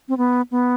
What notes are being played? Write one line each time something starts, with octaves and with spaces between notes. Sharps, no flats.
C4
B3
B3